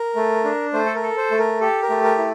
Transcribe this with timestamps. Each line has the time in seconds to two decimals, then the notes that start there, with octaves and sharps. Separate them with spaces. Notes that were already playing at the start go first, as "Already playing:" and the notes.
Already playing: A#4
0.16 A3
0.44 D4
0.73 A3 C5
0.86 A4
0.95 A#4
1.03 A4
1.18 C5
1.31 A3
1.39 A#4
1.61 G4 A4
1.82 A#4
1.90 A3
2.04 A#4
2.18 E4